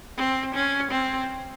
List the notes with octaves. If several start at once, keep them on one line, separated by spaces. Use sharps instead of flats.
C4
C#4
C4